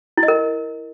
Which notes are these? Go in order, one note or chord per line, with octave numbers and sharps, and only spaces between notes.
E4
D#5
A#4